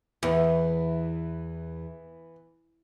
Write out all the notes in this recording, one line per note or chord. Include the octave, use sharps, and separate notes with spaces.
E2 E3 B3